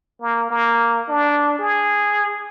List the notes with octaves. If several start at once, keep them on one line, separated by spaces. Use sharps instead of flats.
A#3
A#3
D4
G#4